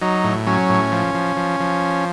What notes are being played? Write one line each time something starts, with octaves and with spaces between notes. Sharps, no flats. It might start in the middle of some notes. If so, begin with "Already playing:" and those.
F#3 D#4
A2
F#3 C#4
A2
F3
F3
F3
F3